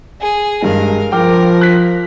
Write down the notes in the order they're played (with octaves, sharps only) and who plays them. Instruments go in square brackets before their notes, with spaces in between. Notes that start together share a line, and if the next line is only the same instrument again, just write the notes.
[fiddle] G#4
[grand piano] G2 G#3 [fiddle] A#4 F5
[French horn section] F3 [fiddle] A#4 [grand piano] G5 D6 F6
[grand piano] F#6 B6